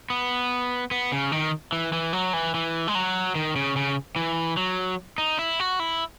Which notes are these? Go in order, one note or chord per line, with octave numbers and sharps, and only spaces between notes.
B3
B3
C#3
D#3
E3
E3
F#3
E3
E3
G#3
F#3
D#3
C#3
C#3
E3
F#3
D#4
E4
F#4
E4